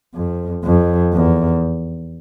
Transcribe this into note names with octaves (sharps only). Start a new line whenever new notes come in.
F2
F2
E2